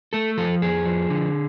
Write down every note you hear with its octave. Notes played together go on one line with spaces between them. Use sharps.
A3 A4
F3 A4
F2 G#4
F3
D3